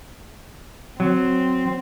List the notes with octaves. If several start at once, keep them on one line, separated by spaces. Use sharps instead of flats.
F#3 C4